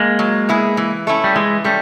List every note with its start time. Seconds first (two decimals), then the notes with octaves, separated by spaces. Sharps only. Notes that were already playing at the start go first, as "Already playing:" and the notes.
Already playing: G#3 A#3
0.19 F#3
0.49 B3 E4 G#4
0.77 E3
1.07 A3 C#4 E4
1.24 G3
1.36 E3 G#3
1.64 G3 A3 C#4